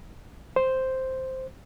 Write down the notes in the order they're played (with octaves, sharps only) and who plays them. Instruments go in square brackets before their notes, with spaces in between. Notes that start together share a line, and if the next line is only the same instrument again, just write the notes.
[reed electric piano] C5